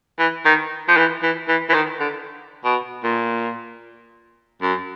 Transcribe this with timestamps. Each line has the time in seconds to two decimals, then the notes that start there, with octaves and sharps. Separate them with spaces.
0.19 E3
0.45 D#3
0.88 F3
0.97 E3
1.23 E3
1.48 E3
1.69 E3
1.74 D#3
2.00 D3
2.64 B2
3.04 A#2
4.62 F#2